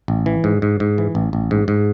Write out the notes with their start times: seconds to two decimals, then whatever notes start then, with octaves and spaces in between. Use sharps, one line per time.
0.08 A1
0.26 E3
0.44 G#2
0.62 G#2
0.80 G#2
0.98 E3
1.15 A1
1.33 A1
1.51 G#2
1.68 G#2